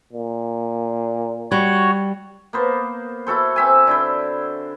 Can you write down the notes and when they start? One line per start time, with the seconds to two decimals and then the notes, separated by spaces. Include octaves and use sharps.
0.13 A#2
1.52 G3 F#4 C#5
2.53 A#3 B3 C5
3.27 E4 F#4 A4 C5
3.56 C4 E5 G#5
3.87 D3 E4 C5